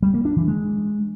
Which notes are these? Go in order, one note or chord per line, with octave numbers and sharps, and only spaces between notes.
G3
A#3
D4
E3
G#3